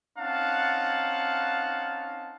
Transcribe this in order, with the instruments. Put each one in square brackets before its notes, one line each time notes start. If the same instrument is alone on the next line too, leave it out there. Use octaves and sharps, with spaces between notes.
[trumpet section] C4 C#4 D#4 F5 F#5 A5